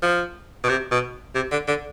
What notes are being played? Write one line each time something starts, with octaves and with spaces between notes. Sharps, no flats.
F3
B2
C3
B2
C3
D3
D3